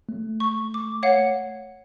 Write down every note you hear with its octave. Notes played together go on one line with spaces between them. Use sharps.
A3
C#6
D6
C#5 F5 F#5